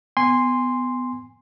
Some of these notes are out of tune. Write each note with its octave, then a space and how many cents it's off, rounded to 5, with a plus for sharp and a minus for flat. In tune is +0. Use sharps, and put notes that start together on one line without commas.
B3 +20 G#5 -20 C6 +0